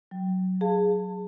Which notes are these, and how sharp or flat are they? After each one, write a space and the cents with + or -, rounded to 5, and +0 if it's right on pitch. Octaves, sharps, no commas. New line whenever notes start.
F#3 +0 G5 -5
G#4 +0 F5 +0 A5 +25